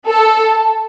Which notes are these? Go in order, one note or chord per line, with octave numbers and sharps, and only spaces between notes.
A4